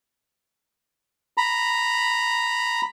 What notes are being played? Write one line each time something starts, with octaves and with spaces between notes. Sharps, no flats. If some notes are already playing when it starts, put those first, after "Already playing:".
A#5 B5